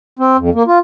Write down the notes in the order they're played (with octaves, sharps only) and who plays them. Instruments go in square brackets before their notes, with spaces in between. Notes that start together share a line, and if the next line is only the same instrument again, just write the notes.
[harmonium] C4
F2
A#3
F4